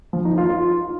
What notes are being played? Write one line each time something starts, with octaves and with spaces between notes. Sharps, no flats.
F3
D#4
F4
F4